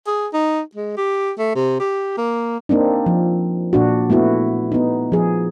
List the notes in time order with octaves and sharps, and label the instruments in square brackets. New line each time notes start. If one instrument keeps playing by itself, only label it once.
[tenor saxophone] G#4
D#4
G#3
G4
A3
C3
G4
A#3
[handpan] A#3 C4 D4 D#4
F3
A#2 D4 F#4
A3 B3 E4 F#4
B3 D#4
F3 G#4